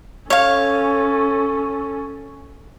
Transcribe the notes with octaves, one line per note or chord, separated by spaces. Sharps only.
C#4 A4 C#5 F5